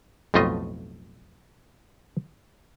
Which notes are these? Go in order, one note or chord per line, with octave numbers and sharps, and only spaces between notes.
B1 F2 A2 A3 F4 D#5